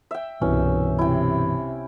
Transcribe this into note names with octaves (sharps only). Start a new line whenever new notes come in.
E5 G5
C2 G2 B2 E3 C#4
C3 E4 G5